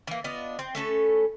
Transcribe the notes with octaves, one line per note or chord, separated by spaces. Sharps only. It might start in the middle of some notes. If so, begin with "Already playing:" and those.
E3 A#3
B3 D4 F4 D#5
C4
A3 C#4 A4 B4